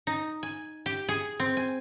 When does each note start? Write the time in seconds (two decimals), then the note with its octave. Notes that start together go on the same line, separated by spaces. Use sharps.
0.07 D#4
0.43 G#5
0.86 G4
1.09 G#4
1.40 C4
1.57 G#5